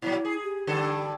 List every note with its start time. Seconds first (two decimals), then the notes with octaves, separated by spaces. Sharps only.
0.02 A#2 F#3 E4
0.25 G#4
0.43 G4
0.67 G2 D3 A4